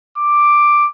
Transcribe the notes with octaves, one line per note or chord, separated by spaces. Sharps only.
D6